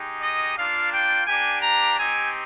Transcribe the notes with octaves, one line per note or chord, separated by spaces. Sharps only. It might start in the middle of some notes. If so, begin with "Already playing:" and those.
Already playing: G#3 D#4 G4
D#5
A#3 D4 F4 F5
G5
A#3 D4 G4 G#5
A#5
C4 D#4 G4 G#5